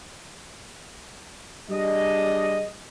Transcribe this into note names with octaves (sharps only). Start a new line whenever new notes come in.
G3 D4 G#4 D#5